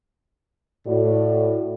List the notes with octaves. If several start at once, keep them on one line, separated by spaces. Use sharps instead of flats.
A2 F#4 D5